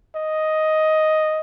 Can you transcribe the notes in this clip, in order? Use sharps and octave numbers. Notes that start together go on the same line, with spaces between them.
D#5